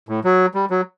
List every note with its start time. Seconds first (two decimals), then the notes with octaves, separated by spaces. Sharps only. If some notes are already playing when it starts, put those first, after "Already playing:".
0.09 A2
0.24 F#3
0.54 G3
0.70 F#3